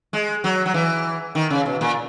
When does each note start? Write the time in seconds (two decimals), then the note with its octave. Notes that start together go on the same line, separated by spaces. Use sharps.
0.13 G#3
0.44 F#3
0.66 F#3
0.74 E3
1.35 D#3
1.50 C#3
1.66 B2
1.81 A#2